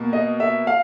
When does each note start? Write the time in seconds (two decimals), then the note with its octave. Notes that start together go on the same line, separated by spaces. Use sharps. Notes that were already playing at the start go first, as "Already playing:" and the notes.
Already playing: B2 A#3
0.13 D#5
0.40 E5
0.67 F5